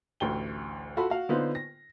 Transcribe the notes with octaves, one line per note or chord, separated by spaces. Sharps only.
A1 D2 G5 G7
F4 F#4 A4 B5
F#4 F5
D3 B3 D#4 F4 C5
A#6